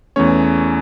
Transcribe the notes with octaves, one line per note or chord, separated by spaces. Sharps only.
E2 E3 A3 C#4 C#5